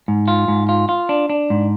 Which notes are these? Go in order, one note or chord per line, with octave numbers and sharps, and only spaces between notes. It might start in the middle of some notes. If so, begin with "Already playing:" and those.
G#2
F4
G#2
F4
F4
D4
D4
G#2